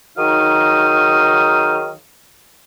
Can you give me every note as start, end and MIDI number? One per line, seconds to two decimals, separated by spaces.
0.18 1.91 51
0.18 1.91 54
0.18 1.91 63
0.18 1.91 68
0.18 1.91 77
0.18 1.91 87